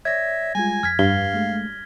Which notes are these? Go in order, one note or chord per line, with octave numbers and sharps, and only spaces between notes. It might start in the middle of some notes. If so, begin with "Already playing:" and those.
C#5 D5 E5 G#6 A#6
G3 G#3 F4 G#5
F2 F6 G#6 B6
G2 F5 G7
G#3 A3